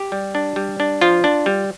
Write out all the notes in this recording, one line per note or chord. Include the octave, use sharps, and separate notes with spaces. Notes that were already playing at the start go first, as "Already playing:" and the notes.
Already playing: G4
G3
D4
G3
D4
F3 F4
D4
G3